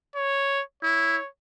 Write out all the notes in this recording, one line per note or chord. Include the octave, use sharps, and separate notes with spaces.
C#5
E4 C#5